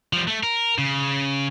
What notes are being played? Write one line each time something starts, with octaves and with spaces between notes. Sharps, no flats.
F3 G3
A3
A#4
C#3